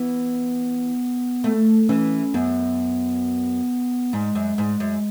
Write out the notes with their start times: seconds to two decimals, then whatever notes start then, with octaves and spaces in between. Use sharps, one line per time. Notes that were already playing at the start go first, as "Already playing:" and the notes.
Already playing: E3 B3
1.44 A3
1.89 E3 C#4
2.34 F#2 B3
4.13 G#2 G#3
4.35 F#2
4.58 G#2
4.80 F#2